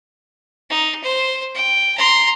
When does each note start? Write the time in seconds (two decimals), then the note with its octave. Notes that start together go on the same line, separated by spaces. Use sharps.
0.70 D#4
1.04 C5
1.55 G5
1.98 A#5 C6